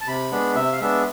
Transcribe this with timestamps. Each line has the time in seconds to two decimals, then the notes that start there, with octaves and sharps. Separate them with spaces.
0.01 A5
0.07 C3 B5
0.31 G#3 B3 D4
0.55 C3 E5
0.73 F5
0.80 G#3 B3 D4 E5